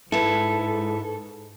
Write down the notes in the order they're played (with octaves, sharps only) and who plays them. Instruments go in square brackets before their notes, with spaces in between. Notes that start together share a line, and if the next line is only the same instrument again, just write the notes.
[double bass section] G#2 [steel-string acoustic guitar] E4 B4 [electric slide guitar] A4